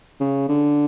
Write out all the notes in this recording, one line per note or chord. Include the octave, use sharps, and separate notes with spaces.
C#3
D3